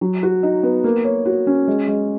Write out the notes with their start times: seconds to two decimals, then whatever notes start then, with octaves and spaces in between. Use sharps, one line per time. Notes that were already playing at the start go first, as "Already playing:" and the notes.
0.01 F#3
0.23 F#4
0.43 D#4
0.63 B3
0.84 A#3
1.04 C#5
1.25 F#4
1.47 C#4
1.68 G#3
1.87 G#3